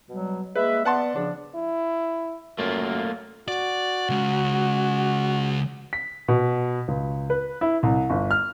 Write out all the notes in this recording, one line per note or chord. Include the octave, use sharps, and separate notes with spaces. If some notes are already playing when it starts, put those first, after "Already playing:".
B2 F#3 G3
G#3 A#3 B4 E5
B3 D5 F#5 A5 C6
C#3 F3 D4
E4
F#2 A3 A#3 F4
F#4 D5
C#3 G#3
B6
B2
C#2
B4
E4
C2
G1
F6